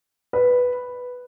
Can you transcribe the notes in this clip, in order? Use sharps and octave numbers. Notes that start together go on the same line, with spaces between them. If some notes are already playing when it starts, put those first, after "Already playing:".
B4